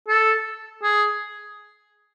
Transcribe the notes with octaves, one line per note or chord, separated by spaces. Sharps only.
A4
G#4